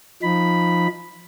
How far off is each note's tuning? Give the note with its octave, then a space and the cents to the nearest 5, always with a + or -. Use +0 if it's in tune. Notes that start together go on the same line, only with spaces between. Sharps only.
F3 +0 D#4 +0 B5 +0